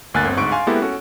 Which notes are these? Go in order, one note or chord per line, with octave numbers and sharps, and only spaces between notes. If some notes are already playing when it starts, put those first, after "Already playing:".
G1 D2 A#3 G#5 F#6 A6
G1 C4
D2 G#2 C#6 D7
F5 G#5 C6
G#3 A#3 B3 E4 G4 A4
C#4 F#4 A4